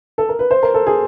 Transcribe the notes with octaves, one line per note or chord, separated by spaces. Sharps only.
A4
A#4
B4
C5
A#4
A4
G#4